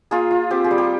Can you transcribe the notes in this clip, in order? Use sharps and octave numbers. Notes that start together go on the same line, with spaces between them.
A#3 F4 G#4
F4
C4 G4
G#4
G3
G4